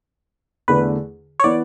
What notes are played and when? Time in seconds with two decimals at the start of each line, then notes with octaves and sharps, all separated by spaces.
0.68 E2 D3 A3 B4
1.40 C#5
1.44 E3 B3 D5